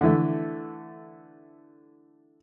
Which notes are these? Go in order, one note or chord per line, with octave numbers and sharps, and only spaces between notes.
D3 E3 A3